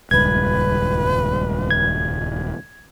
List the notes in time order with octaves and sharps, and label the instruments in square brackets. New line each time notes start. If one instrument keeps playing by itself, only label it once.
[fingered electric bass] D#1 C#2 G2 [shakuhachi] B4 [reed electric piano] G#6
[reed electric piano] G#6